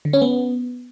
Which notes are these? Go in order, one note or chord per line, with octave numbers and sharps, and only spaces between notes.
D3
C#4
B3